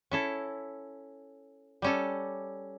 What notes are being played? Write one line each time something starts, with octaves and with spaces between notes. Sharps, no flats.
C#4 E4 A4
G3 C#4 A4